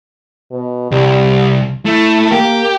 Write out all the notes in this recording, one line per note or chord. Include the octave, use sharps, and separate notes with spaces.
B2
C2 G3
A3 E4
A#3 G4